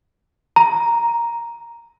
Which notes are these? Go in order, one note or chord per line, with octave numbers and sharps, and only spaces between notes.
A#5